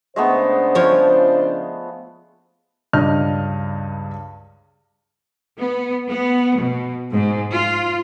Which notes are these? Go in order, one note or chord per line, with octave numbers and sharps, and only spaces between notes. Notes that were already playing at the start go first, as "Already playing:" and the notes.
C#3 G#3 A3 B3 D4 C5
F3 C#5
C#2 G2 D4 D#5 F6
B3
B3
B2
G#2
F4